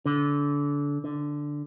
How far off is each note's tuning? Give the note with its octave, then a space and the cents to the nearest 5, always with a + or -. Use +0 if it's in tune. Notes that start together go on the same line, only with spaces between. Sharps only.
D3 -25
D3 +0